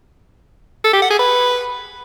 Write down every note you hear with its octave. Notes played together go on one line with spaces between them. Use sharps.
A4
G4
F#5
G#4
B4